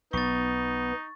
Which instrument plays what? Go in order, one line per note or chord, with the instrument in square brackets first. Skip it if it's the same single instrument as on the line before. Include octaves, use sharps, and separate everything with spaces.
[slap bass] B1 [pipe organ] B3 [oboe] D#4 [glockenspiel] C#6 A6